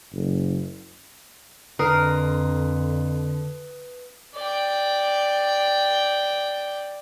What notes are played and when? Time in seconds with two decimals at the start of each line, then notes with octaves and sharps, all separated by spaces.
0.12 F#1
1.79 F2 D3 A#4 B4 D#6 C7
4.35 D5 G5